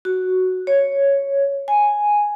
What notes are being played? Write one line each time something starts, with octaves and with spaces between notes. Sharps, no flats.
F#4
C#5
G#5